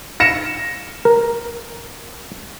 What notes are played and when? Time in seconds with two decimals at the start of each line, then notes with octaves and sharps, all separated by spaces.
0.20 A#6 C#7 E7
1.05 A#4